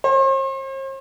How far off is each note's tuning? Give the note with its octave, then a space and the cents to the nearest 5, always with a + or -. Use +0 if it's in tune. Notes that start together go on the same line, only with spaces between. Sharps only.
C5 +45